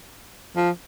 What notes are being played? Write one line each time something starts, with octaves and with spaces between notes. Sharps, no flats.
F3